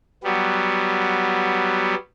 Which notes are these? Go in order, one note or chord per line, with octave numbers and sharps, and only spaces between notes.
F#3 G3 B3